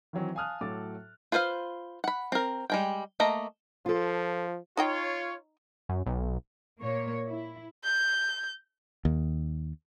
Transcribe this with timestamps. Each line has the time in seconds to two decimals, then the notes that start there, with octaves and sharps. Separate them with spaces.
0.13 D#3 E3 F#3 C4
0.35 F5 G#5 A5 D#6 F6 F#6
0.61 A2 F#3 A4 D6 A6
1.32 F4 B4 C5 E5 F5
2.04 F#5 B5
2.32 C4 A#4
2.70 G3 G#3 G5
3.20 A3 A#3 D#5 A#5
3.86 F3 F4 A4
4.77 D#4 F4 C#5 D#5 G5
5.89 F#2
6.06 B1
6.80 A#2 A#3 C#5
7.27 E4
7.84 G6
9.05 D#2